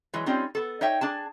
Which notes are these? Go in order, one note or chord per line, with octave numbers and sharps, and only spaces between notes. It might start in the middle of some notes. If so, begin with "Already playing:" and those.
E3 F#3 G#3
G3 C4 C#4 D#4 F4
B3 A4
D#4 C#5 E5 G5
D4 G#4 A5